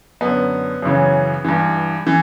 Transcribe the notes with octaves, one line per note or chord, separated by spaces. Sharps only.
F#2 D3 B3
F#2 C#3 E3
G2 E3
E3